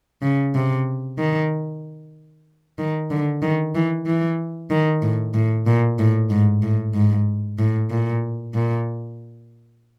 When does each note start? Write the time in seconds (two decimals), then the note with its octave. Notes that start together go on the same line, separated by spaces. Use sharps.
0.22 C#3
0.55 C3
1.18 D#3
2.78 D#3
3.10 D3
3.42 D#3
3.75 E3
4.06 E3
4.71 D#3
5.02 A2
5.34 A2
5.66 A#2
5.99 A2
6.30 G#2
6.62 A2
6.94 G#2
7.59 A2
7.91 A#2
8.54 A#2